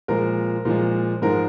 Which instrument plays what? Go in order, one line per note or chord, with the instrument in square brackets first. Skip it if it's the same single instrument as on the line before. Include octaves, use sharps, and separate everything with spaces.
[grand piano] A#2 F3 G#3 A#4
A#2 F3 G#3
G#2 F3 G#3 A#4